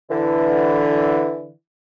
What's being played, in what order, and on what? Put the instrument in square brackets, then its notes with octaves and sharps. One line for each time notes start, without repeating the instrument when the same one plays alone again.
[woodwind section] D3 E3